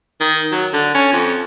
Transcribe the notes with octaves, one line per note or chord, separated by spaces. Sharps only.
D#3
F#3
D3
C#4
F2